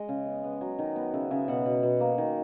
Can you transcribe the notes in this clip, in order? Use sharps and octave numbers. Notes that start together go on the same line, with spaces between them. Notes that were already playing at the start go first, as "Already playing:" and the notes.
Already playing: G#3 D#5
C#3
B3
B3
F#3
D#3
B3
C#3 E5
C#3 E5
B2 F#5
B2
B2
A#3
D#3